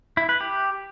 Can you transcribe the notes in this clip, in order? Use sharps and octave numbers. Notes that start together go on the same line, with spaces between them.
E4
B4
G4